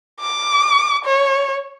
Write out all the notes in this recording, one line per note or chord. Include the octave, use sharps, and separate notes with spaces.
D6
C#5